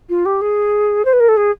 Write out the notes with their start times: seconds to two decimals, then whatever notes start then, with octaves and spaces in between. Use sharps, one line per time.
0.09 F4
0.26 G4
0.41 G#4
1.05 C5
1.13 B4
1.20 A#4
1.29 A4
1.37 G#4